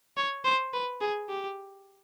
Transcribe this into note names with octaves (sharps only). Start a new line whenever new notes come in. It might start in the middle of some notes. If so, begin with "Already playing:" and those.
C#5
C5
B4
G#4
G4